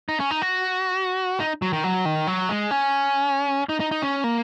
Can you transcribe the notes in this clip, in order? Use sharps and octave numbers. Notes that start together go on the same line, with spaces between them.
D#4
C#4
D#4
F#4
D#4
F#3
D#3
F#3
D#3
F#3
G#3
C#4
D#4
D#4
D#4
C#4
A#3